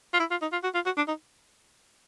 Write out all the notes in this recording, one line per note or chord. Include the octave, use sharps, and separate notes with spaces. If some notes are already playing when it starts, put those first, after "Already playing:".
F4
E4
F4
D#4
F4
F#4
F4
F#4
D4
D#4